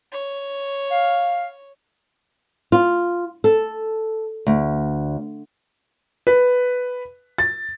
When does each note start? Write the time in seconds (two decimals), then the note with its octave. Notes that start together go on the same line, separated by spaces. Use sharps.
0.12 C#5
0.91 F5
2.72 F4
3.44 A4
4.47 D2
6.27 B4
7.38 A6